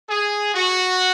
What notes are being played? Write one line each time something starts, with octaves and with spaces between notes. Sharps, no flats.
G#4
F#4